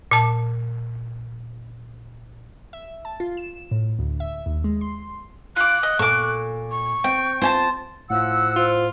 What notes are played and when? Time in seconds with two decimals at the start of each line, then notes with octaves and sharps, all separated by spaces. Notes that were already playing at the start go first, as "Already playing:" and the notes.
0.11 A#2 A5
2.73 E5
3.05 A5
3.20 F4
3.37 E7
3.71 A2
3.99 D2
4.20 E5
4.46 D#2
4.64 G#3
4.81 C6
5.56 F4 D6 F#6
5.83 D#5
5.99 A#2 A4 C#6 D6
6.71 C#6
7.04 C4 G5
7.42 C4 F4 C5 G#5 A5
8.10 A2 F3 F#5 E6
8.56 F4 C5